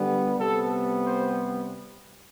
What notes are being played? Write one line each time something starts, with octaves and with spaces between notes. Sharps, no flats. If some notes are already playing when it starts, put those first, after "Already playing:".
Already playing: D3 G3 B3
C3 G3 B3 A4
C5